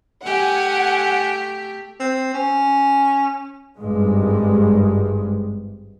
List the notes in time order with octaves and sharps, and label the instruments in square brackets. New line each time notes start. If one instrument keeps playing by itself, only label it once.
[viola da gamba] A3 G4 [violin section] F#5 G#5
[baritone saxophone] C4
C#4
[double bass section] G#1 G2 G#3